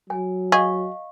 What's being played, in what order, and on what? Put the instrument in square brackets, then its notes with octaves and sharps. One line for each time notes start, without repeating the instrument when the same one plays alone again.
[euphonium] F#3 [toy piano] G#5
[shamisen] G#4 [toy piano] D#5 F5 C#6